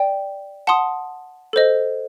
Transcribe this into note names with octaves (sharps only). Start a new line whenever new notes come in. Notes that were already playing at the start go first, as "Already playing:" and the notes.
Already playing: D5 G5
F#5 A5 C6 D#6
A4 C5 D#5